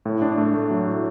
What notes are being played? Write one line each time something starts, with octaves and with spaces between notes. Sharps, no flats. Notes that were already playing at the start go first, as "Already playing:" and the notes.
A2
D4
A3
A3
F#3
A2